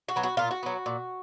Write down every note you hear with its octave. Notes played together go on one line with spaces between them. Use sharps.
F#4
F#3 B3
F#4
A#2 F4
F#4
F#3 B3
A#2